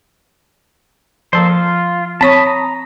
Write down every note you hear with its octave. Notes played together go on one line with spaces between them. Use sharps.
F3 A#3 A4 C5
F4
C4 C#5 A5 B5 C#6 D#6
A#5